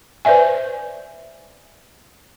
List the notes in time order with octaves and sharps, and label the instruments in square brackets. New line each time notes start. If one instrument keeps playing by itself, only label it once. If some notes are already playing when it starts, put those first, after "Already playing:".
[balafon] B4 C5 D5 E5 G#5